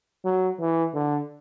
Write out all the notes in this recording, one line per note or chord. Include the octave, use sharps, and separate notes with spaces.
F#3
E3
D3